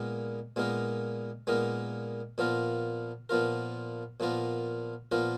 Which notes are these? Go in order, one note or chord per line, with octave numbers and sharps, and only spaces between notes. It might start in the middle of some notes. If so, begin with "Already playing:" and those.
Already playing: A#2 G#3 B3 D#4 A#4
A#2 G#3 B3 D#4 A#4
A#2 G#3 B3 D#4 A#4
A#2 F3 B3 F4 A#4
A#2 F3 B3 F4 A#4
A#2 F3 B3 F4 A#4
A#2 F3 B3 F4 A#4